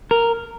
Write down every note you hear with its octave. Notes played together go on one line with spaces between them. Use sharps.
A#4